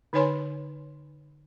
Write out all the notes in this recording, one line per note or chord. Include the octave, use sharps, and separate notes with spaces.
D3 D#4 B4 C#5 G#5 C6